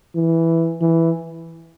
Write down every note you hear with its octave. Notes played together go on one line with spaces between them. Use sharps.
E3
E3